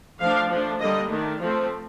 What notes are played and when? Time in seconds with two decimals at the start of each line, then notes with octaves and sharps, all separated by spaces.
0.21 F3 A3 D4 F5
0.50 F3 A3 D4
0.80 D3 G3 A#3 D#5
1.11 D#3 A3 D4
1.40 F3 A3 C4 F4